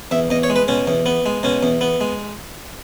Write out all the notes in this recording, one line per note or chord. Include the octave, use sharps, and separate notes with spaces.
E2 E5
E2 D#5
C#5
G#3
B4
B2 C#4
E2
B3
G#3
B2 C#4
E2
B3
G#3